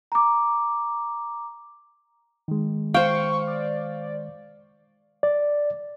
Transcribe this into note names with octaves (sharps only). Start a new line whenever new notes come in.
A#5 D6
D#3 G#3
C5 F5 G5 C#6
D5
D5